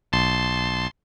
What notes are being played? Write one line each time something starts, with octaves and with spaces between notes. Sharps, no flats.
B1 A5 C6